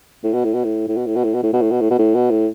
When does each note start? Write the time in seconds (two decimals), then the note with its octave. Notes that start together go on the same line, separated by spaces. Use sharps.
0.24 A2
0.34 B2
0.44 A2
0.54 B2
0.64 A2
0.88 A2
0.97 B2
1.07 A2
1.16 B2
1.24 A2
1.34 B2
1.43 A2
1.53 B2
1.62 A2
1.71 B2
1.81 A2
1.90 B2
1.99 A2
2.15 B2
2.31 A2